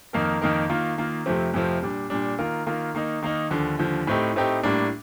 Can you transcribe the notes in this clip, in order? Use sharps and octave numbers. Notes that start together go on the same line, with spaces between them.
F2 D#3 A#3 D#4 A#4
F2 D#3 A#3 D#4 A#4
D#3 A#3 F4
D#3 A#3 F4
F2 C3 F3 A3 C4
F2 C3 F3 A3 C4
A#2 G3 D4
A#2 G3 D4
D#3 A#3 F4 A#4
D#3 A#3 F4 A#4
D#3 A#3 D#4
D#3 A#3 D#4
D#2 D3 F3
D#2 D3 F3
A2 A3 C4 D#4 G4
A2 A3 C4 D#4 G4
A2 G3 A#3 D4